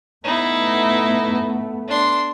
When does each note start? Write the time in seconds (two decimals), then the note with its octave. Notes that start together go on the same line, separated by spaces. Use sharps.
0.24 A3 B3 D#4 E4
1.88 D4 C6